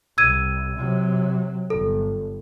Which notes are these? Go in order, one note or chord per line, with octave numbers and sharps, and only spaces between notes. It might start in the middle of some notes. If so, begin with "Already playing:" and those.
C2 E6 G#6 D#7
C3 F#3
G1 A4